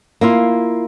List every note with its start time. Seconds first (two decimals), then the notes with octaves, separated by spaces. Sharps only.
0.21 A#3 E4 F4